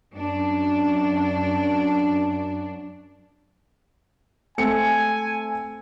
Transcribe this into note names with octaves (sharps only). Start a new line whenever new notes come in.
F#2 D4
A3 C4 G#5 C#7